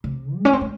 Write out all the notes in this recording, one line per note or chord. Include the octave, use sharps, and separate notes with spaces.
C3
G#3
C#4
C4
G#3